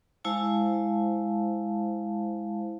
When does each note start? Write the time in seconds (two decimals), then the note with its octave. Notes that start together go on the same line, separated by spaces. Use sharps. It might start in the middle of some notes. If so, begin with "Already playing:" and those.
0.24 G#3 E4 C5 F5 A5